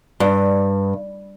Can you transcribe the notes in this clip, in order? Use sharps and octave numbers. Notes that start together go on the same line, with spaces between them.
G2